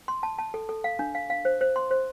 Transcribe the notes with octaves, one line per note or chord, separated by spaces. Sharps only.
C6
A5
A5
A4
A4
F5
D4
F5
F5
C5
C5
C6
C5